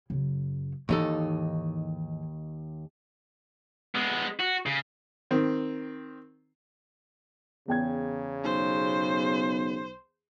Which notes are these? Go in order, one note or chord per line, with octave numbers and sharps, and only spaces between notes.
F#2 C#3
D#2 G#2 E3 D#4 A4
G#3 B3
F#4
C#3
D#3 C4
E2 C#3 G5 G#6
B1 C5